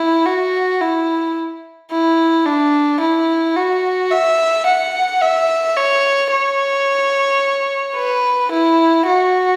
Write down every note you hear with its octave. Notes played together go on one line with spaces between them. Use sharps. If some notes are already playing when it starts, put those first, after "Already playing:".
Already playing: E4
F#4
E4
E4
D4
E4
F#4
E5
F#5
E5
C#5
C#5
B4
E4
F#4